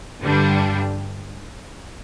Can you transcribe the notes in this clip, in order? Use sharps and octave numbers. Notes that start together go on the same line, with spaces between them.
G2 D3 G3 D4